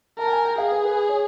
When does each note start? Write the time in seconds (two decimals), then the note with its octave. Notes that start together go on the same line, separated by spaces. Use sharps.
0.18 A#4 A5
0.26 G5
0.32 G#5
0.45 G5
0.58 G#4 F5
0.72 B4
0.85 B4
1.09 C#5